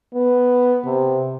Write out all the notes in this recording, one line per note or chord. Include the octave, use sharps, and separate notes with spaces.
B3
C3